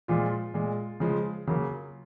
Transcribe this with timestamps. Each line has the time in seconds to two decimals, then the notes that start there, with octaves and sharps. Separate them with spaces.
0.08 A#2 F3 G#3 F4
0.54 A#2 G#3
1.00 C#3 F3 G#3
1.47 C#3 F#3 A#3